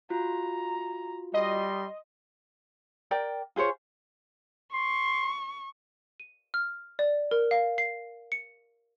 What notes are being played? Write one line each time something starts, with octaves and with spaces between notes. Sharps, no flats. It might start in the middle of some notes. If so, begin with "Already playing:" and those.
F4 F#4 A#5
G3 D#5 C6
A#4 D5 G5
F4 G#4 C5 C#5
C6 C#6
D#7
F6
D5
A#4
F5
C7
C#7